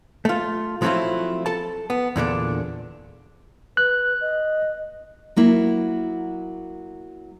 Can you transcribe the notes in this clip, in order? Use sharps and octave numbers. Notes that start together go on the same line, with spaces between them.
A3 F4
F3 F#3 A3 C4 E4 F4
A4 A5
B3
E2 A#2 D3 D4
B4 F#6
D#5
F#3 A#3 E4